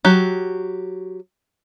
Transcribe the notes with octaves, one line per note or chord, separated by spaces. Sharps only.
F#3 G4